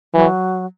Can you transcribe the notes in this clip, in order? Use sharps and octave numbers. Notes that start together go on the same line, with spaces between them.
E3 F#3